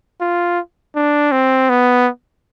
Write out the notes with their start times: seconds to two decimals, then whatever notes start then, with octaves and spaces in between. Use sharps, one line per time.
0.21 F4
0.96 D4
1.32 C4
1.70 B3